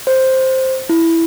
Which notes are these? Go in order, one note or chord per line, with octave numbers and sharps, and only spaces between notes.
C5
E4